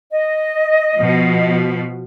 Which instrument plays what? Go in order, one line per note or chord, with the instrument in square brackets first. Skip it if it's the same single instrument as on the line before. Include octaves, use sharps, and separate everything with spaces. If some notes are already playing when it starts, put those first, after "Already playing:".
[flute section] D#5
[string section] B2 F3